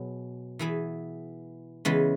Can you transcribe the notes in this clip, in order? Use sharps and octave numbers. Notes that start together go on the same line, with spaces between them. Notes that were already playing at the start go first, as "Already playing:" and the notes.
Already playing: B2 F#3 G#4
E3 B3 E4 G#4
C#3 E3 G#3 B3